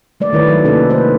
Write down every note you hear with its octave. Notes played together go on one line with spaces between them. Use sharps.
G3 A3 D5
D#3 E4 B4 C#5
F#3
C3 A#3 C#4 D#4 A4 B4
A3 A#3 B4 C5